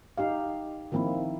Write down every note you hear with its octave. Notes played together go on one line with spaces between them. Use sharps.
D#4 G4 F5
D#3 F3 A#3 C4 E4